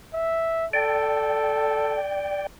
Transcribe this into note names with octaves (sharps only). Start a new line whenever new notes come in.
E5
A4 D5 G5